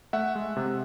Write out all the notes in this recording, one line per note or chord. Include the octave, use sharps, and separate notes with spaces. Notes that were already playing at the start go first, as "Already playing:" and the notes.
A3 E5 F#5
G#3
C3